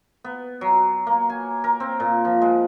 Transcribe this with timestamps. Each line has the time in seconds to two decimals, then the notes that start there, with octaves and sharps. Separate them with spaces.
0.24 B3
0.61 F#3
1.07 A#3
1.29 G#5
1.64 A#4
1.80 C4
2.00 A#2
2.25 F3
2.41 G#3